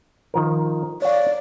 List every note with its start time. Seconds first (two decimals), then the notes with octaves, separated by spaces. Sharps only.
0.34 D#3 F3 A#4
1.02 C#5 D5 F5